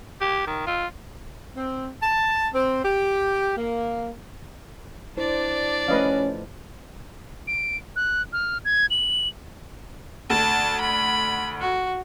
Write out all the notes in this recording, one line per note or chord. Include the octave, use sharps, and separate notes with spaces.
G4
D#3
F4
C4
A5
C4
G4
A#3
D4 E4 C5 D5
F3 A3 C#4 B4 D#5 F5
D7
F#6
F6
G#6
F#7
D2 A5
B5
F#4